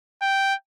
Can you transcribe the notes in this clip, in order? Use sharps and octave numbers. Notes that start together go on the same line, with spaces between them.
G5